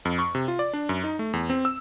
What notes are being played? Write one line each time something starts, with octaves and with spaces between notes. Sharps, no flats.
F2
C#6
C3
F4
D5
D4
F#2
D#4
A3
E2
C4
E6